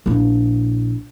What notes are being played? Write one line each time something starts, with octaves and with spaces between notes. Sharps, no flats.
A#1 E4